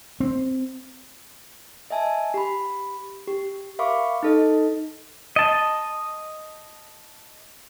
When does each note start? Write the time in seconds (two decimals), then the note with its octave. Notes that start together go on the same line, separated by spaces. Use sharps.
0.20 C4
1.91 D#5 E5 G#5 A5
2.34 G4 B5
3.28 G4
3.79 A#4 E5 F5 B5 C#6 D6
4.23 D#4 A4 D#5
5.36 D#5 A5